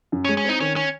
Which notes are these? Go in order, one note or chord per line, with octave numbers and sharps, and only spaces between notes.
F#2
C#4
G#3
C#4
C4 D#4
D#3 C#4
C#4